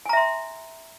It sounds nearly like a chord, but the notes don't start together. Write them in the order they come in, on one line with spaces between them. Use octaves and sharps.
G#5 A#5 E5 C6